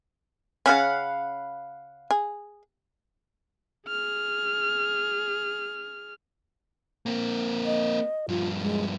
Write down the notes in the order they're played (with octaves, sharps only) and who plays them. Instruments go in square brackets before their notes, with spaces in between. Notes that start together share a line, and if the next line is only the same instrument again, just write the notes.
[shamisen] C#3 C#4 [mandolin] F5 F#5 B5
[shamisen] G#4
[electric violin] G#4 F6
[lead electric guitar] A#3 C4
[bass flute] D#5
[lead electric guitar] G2 F3 [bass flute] F4
[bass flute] G#3